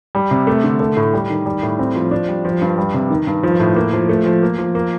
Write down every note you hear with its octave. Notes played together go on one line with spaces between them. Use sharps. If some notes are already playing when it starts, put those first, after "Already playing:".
G3
C3
A3
D3
A3
A2
G3
D#3
G3
A2
C4
F3
D4
G3
F3
G2
G3
C3
D#3
G2
F3
A2
A#3
F3
A3
F3
A#3
F3
A#3